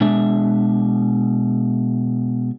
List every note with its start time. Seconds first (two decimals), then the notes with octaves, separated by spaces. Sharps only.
0.01 B2 G#3 D4 E5